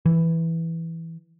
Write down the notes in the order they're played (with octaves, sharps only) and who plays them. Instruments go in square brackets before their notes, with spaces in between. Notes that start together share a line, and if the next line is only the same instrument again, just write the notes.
[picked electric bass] E3